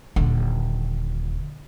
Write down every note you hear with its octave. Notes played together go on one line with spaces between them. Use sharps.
D#1 D3